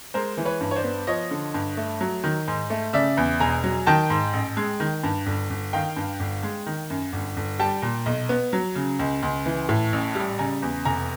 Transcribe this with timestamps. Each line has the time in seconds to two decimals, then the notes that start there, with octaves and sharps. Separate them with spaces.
0.14 G#3 A#4 C5
0.37 E3
0.45 B4 C#5
0.61 G2
0.71 C#5
0.76 C5 D5
0.84 B3
1.07 F3 C#5 D#5
1.31 D3
1.54 G2
1.77 A3
2.01 F#3
2.24 D#3
2.48 G#2
2.70 A3
2.93 C#3 D5 E5
3.17 E2
3.40 E1 G#5 A#5
3.64 F#3
3.87 D#3 G5 A5
4.10 G#2
4.33 A1
4.57 G#3
4.80 D#3
5.03 G2
5.26 G1
5.50 G1
5.73 D#3 F5 G5
5.96 G2
6.20 G1
6.43 G#3
6.66 D#3
6.90 F#2
7.13 G1
7.36 G1
7.59 G3 G5 A5
7.82 A#2
8.06 B1
8.29 B3
8.53 F#3
8.75 C#3
8.99 C#2
9.23 C#2
9.46 E3
9.69 A2
9.93 A1
10.15 G3
10.38 C#3 G#5 A#5
10.62 E2
10.85 F1 G#5 A#5